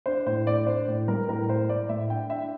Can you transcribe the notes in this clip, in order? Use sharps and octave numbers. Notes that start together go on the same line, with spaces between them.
D4 C5
A2 C5
A2 D5
D4 C5
A2
G3 A#4
A2 A#4
A2 C5
A2 D5
A2 E5
D4 G5
D4 E5